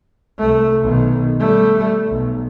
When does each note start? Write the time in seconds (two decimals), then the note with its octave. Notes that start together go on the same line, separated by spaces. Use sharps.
0.38 C2 A3
0.82 B1 D#3
1.39 G3 A3
2.08 B1